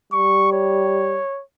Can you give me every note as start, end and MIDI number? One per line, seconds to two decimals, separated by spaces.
0.13 1.21 55
0.13 0.52 85
0.52 1.42 73